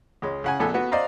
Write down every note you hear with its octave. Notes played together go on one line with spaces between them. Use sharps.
C#2 G#3 C#4
C#3 F#5 G#5
A#1 B3 A4 G#5
B3 F#4 B4
C5 D5 D#5 F5 A#5